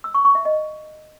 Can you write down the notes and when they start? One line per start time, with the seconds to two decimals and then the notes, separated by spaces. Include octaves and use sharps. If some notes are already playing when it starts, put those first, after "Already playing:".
0.04 E6
0.14 C#6
0.25 C#6
0.35 E5
0.45 D#5